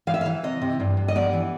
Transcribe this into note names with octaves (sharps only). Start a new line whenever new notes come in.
E3 F5
E5
F5
E3
C3 D#5
C3
G2
G2
D#5
B3 D5
E3